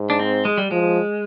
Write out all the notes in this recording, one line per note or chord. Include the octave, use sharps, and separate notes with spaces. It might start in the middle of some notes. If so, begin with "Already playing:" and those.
Already playing: G#2
D4
C4
G#3
G3
F3 G#3